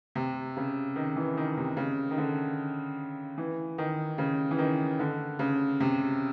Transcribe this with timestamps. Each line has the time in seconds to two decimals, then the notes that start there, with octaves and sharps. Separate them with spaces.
0.15 C3
0.57 C#3
0.96 D#3
1.16 E3
1.37 D#3
1.57 C3
1.77 C#3
2.11 D#3
2.18 D3
3.38 E3
3.78 D#3
4.18 C#3
4.51 E3
4.58 D#3
4.99 D3
5.39 C#3
5.80 C3